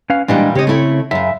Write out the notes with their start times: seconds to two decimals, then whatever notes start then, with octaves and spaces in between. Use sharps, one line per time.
0.10 C#4 B4 F5
0.28 A#2 E3 G3 G#3 D4 D#5
0.55 C#3 C4 G4 C#5 D#5
0.67 A3 E4
1.11 F#2 C#3 E5